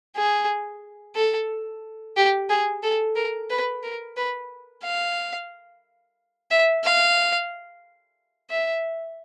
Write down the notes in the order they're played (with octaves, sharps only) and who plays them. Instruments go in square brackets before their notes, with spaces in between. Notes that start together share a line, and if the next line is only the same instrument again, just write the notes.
[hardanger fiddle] G#4
A4
G4
G#4
A4
A#4
B4
A#4
B4
F5
E5
F5
E5